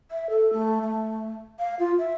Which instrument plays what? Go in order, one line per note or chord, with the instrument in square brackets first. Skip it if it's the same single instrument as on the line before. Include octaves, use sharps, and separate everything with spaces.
[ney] E5
A4
A3
A3
F5
F4
E5